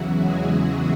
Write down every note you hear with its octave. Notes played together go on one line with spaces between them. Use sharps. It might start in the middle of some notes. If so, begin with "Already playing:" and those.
Already playing: E2 C#3 E3 F#3 E4 F#4
G#3 G#4